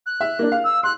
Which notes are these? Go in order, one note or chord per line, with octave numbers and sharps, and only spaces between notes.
F#6
E5
A#3 D4
F5
E6
C6 F#6